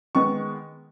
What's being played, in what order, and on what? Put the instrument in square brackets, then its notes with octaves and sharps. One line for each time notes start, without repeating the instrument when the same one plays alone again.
[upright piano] D#3 G#3 B3 C#6